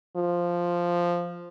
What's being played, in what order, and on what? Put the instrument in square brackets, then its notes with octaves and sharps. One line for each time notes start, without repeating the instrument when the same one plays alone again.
[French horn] F3